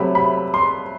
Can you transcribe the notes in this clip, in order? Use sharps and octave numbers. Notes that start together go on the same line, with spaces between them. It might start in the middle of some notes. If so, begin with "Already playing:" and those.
Already playing: C3 F#3 A3 B5
B5
C6